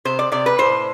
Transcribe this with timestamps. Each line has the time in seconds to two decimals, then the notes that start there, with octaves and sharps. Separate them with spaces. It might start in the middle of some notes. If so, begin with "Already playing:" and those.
0.05 C3 C5
0.19 D5
0.32 C3 D5
0.46 B4
0.59 A2 C5